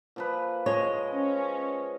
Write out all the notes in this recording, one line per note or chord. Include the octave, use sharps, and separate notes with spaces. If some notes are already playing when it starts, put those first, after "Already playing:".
A#2 F3 B4
F3 G#3 C#5 D#5
C#4